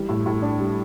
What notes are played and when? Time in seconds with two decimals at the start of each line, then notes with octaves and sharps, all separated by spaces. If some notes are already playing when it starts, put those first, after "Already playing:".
Already playing: E3 G3
0.09 A2
0.26 A2
0.42 D4
0.59 G3